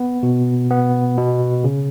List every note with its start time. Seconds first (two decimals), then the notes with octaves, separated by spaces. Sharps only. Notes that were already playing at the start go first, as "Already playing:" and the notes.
Already playing: B3
0.23 B2
0.70 B3
1.18 B2
1.64 C#3